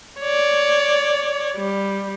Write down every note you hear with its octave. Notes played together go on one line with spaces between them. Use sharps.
C#5 D5
G3